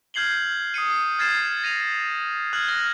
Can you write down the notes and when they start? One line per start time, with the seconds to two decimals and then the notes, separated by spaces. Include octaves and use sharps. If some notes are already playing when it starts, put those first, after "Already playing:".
0.14 F6 G6 G#6 C7 F#7 G7
0.74 D#6 C7 C#7 D#7
1.19 F6 G#6 A6 C7 E7
1.63 A#6 D#7 F7
2.53 F6 F#6 G#6 F#7
2.68 F6 A#6 G7